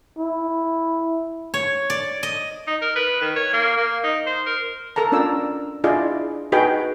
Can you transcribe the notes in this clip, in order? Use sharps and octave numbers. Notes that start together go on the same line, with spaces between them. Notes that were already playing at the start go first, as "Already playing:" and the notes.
E4
C#5
D5
D#5
D#4
A#4
B4
D#3
C#5
A#3
A#3
D#4
C5
A#4
A4 A#4 A5 A#5
C#4 D4 F4 D5 E6
D4 E4 F4 G#4 D5 D#5
D#4 F#4 G#4 B4 D#5 G5